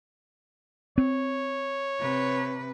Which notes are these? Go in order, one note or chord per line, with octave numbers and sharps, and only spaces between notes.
C4 C#5
C3 B4